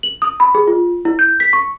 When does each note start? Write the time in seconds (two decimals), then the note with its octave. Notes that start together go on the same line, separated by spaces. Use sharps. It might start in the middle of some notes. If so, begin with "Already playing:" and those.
0.03 F#7
0.22 D#6
0.40 B5
0.55 G#4
0.67 F4
1.05 E4
1.19 G6
1.40 B6
1.53 C#6